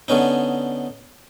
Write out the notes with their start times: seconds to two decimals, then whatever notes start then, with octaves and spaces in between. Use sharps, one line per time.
0.08 D3 B3 C#4 D#4